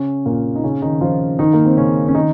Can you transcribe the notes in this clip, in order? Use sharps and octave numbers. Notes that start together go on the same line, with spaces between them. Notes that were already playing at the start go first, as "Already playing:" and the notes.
Already playing: C#3 C#4
A#2 A#3
D#4
C#3 C#4
D#3 D#4
F3 F4
D#3 D#4
A#3
C4
C#3 C#4
C#4
D#3 D#4